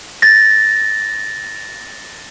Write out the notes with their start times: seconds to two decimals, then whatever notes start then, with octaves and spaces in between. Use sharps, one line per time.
0.22 A6 A#6